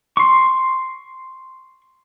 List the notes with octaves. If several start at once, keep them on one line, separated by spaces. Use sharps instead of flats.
C6 C#6